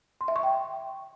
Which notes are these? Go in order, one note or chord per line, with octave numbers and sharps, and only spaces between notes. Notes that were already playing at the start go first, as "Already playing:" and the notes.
C6
E5
C#6
G5